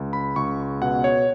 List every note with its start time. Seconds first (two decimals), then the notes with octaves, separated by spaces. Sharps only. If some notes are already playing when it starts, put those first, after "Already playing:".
Already playing: C#2
0.13 B5
0.36 C#2 C#6
0.82 B2 F#5
1.04 C#5